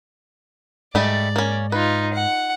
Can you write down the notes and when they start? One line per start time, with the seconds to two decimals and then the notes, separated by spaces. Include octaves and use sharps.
0.95 G#2 G3 A3 D5 D#5
1.36 A#3 C#4
1.72 D#4 F4 B4
2.14 F#5